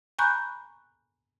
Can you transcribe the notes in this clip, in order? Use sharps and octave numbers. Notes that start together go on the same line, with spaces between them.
G#5 A#5 B5 C#6 F#6 G6